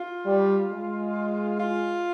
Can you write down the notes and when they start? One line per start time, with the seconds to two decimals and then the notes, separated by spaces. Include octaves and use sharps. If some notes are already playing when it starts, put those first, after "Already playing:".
Already playing: F4
0.26 G3
0.70 G#3
1.59 F4